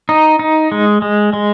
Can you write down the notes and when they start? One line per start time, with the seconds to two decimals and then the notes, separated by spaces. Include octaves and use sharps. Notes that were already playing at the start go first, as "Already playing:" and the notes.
0.09 D#4
0.39 D#4
0.72 G#3
1.02 G#3
1.33 G#3